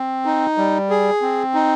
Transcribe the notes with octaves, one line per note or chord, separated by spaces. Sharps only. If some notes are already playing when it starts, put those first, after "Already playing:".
Already playing: C4
D#4
G3
G#4
C4
D#4